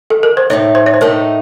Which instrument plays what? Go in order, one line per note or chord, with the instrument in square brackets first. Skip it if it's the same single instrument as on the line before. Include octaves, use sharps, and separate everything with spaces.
[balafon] A4
A#4
C5
[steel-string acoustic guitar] A2 A3 D#4 [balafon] C#5
[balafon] C5
C#5
C5
[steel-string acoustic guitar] A2 A3 D#4 [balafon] A#4